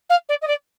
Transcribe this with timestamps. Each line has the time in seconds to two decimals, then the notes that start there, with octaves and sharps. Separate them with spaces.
0.10 F5
0.29 D5
0.42 D#5
0.47 D5